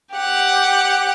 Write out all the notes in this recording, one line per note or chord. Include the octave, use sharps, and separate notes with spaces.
G4 F#5